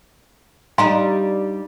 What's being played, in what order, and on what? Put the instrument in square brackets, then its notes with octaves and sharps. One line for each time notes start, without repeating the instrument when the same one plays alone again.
[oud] G3 D4 D#4 [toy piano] F5 A#5 C6